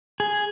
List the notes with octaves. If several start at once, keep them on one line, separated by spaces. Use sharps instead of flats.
G#4